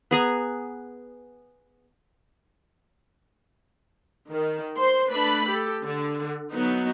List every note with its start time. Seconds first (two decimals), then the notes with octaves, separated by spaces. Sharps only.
0.11 B3 G#4 A#5
4.30 D#3
4.75 C5 C6
5.10 A3 D4 B4 B5
5.47 G4 A4
5.83 D3
6.52 F#3 B3 D#4